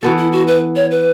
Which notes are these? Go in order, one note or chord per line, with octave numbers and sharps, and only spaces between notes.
E3 B3 F#4 A4
E4
F#4
B4
C#5
B4